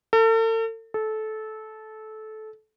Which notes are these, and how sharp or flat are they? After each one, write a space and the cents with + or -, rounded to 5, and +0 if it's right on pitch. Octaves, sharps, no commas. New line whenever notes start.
A4 +40
A4 -20